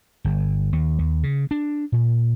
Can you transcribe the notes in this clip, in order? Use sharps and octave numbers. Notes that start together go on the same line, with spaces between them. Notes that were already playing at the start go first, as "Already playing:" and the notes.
G1
D#2
D#2
C#3
D4
A#2